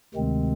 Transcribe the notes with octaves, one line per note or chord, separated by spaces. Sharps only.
D2 C3 D#3 G#3 C4